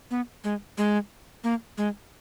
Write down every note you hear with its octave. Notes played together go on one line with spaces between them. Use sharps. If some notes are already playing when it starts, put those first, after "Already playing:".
B3
G#3
G#3
A#3
G#3